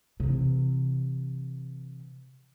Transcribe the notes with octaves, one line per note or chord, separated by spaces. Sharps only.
C3 E3